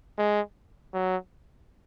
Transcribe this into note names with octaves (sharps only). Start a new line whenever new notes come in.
G#3
F#3